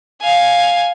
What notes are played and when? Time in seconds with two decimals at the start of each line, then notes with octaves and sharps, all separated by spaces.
0.22 F5 G#5